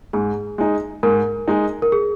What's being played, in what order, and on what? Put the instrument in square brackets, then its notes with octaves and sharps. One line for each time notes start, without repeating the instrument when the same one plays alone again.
[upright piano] G#2 [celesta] G#4
[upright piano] G#3 D#4
[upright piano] G#2 [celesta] A#4
[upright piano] G#3 D#4
[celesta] A#4
G#4